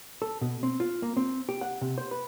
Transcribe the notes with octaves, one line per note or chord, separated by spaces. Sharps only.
A4
B2
C4
F4
A#3
C4
G4
F#5
C3
C5
B4